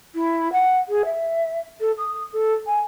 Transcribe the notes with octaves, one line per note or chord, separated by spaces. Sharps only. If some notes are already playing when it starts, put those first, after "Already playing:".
E4
F#5
G#4
E5
A4
D#6
A4
G#5